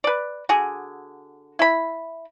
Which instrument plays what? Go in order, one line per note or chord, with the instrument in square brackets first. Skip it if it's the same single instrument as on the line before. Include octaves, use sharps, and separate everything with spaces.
[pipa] B4 D5
D3 F#4 G#4
E4 B5